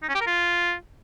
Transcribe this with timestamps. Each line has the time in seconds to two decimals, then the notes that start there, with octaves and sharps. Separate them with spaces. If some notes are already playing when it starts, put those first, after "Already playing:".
0.03 D#4
0.09 C#4
0.15 G4
0.21 A#4
0.27 F4